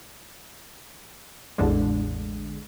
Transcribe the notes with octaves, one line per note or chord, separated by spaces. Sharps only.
A1 E2 D3 G#3